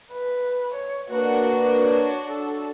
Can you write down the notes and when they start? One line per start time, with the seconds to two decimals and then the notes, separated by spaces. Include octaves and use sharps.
0.12 B4
0.75 C#5
1.10 A#3 D4 F#4 A#4 B4 F#5
1.81 C#5
2.26 A4